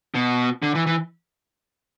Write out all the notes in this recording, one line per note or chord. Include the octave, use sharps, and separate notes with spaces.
B2
D3
E3
E3